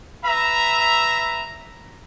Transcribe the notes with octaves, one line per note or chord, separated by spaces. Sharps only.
B4 E5 A#5